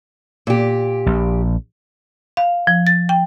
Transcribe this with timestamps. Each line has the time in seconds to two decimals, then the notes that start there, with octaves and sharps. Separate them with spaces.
0.47 A#2 G4
1.06 A#1
2.37 F5
2.67 F3
2.87 A6
3.09 G5